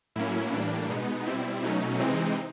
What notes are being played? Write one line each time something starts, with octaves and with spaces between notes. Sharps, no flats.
A2 F#3 A#3 C#4 E4
A2 E3 G3 A#3 D4
B2 G#3 B3 D#4
B2 G3 C4 E4
B2 F#3 A3 C#4 D#4
C3 E3 G#3 C4